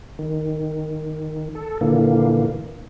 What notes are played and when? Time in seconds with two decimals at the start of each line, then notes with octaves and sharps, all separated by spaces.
0.19 D#3
1.55 A4
1.81 A#2 D3 E3 A#3